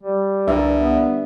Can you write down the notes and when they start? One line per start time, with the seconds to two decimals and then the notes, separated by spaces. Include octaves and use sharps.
0.03 G3
0.47 C2 G2 D3 A#4 E5
0.78 B3